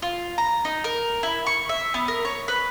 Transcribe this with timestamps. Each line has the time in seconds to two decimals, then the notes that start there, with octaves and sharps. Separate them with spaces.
0.02 F4
0.38 A#5
0.65 D#4
0.84 A#4
1.23 E4
1.46 C#6
1.69 E5
1.94 B3
2.08 A#4
2.25 C#5
2.48 B4